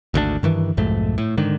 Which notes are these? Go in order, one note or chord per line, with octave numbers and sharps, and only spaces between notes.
G#1 D2 B2 D4
G2 D#3 E3
B1 F2 G#2 A3
A2
G#2 D3 D#3